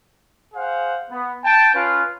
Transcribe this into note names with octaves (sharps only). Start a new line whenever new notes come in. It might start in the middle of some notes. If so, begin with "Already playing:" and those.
G#4 C5 F5 F#5
B3
G5 A5
C#4 F4 B4 F5